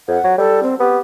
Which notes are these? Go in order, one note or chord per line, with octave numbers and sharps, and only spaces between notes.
F2 F#5
F#3
G3 A4
C4
B3 G4